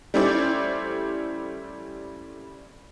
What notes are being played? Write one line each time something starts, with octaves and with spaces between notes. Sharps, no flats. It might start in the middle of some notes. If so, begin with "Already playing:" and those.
G3 A3 C#4 E4 C5 D5